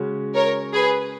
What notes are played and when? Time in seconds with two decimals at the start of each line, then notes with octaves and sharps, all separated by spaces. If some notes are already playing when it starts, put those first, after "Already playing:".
Already playing: C#3 G#3 C#4 F#4
0.35 A#4 C#5
0.73 G#4 B4